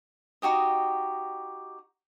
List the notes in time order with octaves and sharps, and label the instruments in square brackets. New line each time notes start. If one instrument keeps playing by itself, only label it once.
[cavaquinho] D#4 F#4 G4 D#5